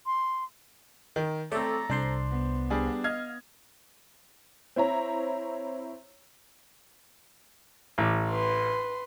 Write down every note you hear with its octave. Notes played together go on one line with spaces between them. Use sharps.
C6
D#3
A3 C4 A4 C#5 D5 E5 A#5
C2 D4 C5 C6
B3
G3 D4 G#4
D#5 F5 F6 G#6
C4 E4 C#5 A#5
A1 D6
B4 C6